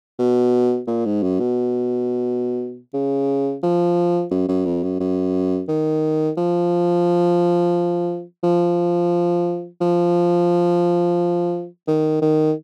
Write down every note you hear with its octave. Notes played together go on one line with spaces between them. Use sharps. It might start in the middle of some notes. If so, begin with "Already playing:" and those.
B2
A#2
G#2
F#2
B2
C#3
F3
F#2
F#2
F2
F#2
F#2
D#3
F3
F3
F3
D#3
D#3